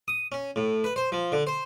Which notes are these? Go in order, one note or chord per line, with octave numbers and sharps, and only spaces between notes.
D#6
C#4
A2
B4
C5
F3
D3
C5